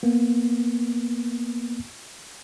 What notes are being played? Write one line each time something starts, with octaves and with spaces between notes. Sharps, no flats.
A#3 B3